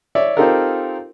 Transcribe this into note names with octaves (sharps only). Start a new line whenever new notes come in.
C#5 D5 E5
C4 D#4 F4 G4 A4 A#4